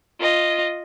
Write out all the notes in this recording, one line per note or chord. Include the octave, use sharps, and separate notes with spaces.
F4 D#5